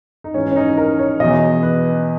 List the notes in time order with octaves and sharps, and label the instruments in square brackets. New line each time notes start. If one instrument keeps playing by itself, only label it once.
[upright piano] D#4
G#2 E3 C#4
C#4
D#4
A#4
C#5
E2 B2 D#5
B4